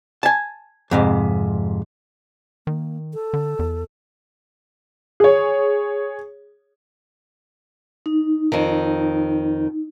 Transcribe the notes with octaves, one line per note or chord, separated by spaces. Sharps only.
G#5 A5
F2 G#2 C3
D#3 A#3
A4
D3
E2
G#4 C#5
D#4
F2 D#3